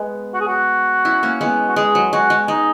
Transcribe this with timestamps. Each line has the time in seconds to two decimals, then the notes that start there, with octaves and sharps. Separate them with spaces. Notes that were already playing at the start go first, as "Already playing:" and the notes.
Already playing: G#3 B3
0.34 F#4
0.41 G#4
0.48 F#4
1.05 C#4 E4
1.23 A#3 C#4
1.41 G#3 B3
1.69 F#4
1.76 G#3 G#4
1.95 F#3
2.13 G#3 F#4
2.30 G#3
2.48 G#3 D#4